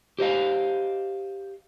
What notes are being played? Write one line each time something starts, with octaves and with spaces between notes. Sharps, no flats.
G4 C5 D#5 F5